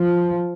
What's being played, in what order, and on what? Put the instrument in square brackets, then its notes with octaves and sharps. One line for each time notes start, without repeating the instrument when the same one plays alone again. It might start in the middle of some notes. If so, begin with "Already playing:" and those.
Already playing: [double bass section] F3